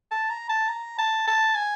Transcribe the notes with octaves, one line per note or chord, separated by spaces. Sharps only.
A5
A#5
A5
A#5
A5
A5
G#5